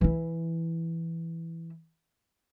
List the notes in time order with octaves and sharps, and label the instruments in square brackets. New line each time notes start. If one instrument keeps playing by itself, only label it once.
[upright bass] E3 E4